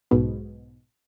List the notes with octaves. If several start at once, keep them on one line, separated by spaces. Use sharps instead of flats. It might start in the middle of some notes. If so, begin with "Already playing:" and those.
B1 G#2 B2